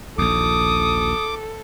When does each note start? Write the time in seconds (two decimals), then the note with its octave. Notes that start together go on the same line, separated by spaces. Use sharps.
0.18 A#1 D#2 A4 D6 D#6